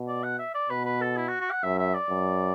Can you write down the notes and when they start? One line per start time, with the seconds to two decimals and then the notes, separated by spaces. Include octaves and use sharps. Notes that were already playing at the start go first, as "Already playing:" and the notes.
Already playing: B2
0.08 D5
0.23 F#5
0.39 E5
0.55 D5
0.70 B2 B4
0.85 B4
1.01 A4
1.17 E4
1.28 F#4
1.40 F#4
1.51 F#5
1.63 F#2 E5
1.79 E5
1.94 D5
2.10 F#2